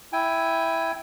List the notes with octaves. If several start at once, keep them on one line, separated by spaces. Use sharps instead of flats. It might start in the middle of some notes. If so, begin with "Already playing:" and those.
E4 G5 G#5